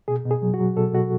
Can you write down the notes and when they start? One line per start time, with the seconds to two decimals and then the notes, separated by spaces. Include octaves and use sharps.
0.08 B2 G#4
0.25 B2
0.31 G#4
0.42 F#3
0.54 F#4
0.60 F#3
0.77 B2 A4
0.94 B2 F#4